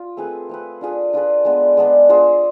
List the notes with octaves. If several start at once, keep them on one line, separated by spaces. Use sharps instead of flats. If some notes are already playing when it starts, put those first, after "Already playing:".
Already playing: F4
A3 C4 G#4 B4
A3 C4 G#4 B4
D4 F4 G#4 B4
D4 F4 G#4 B4
G#3 B3 D4
G#3 B3 D4
D4 F4 G#4 C5